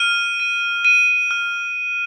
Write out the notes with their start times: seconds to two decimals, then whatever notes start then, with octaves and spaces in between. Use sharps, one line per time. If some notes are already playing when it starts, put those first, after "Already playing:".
Already playing: F6 D#7
0.40 D#7
0.85 D#7
1.31 F6